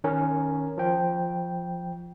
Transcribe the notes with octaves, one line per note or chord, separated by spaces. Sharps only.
D#3 C#4 A#4
F3 G5